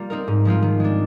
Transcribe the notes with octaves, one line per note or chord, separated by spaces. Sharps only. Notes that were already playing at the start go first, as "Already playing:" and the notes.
Already playing: G3 A#3 F4
C4 D#4 A#4
G#2
F3 G#3 C4 F4
D#3
G#3 D4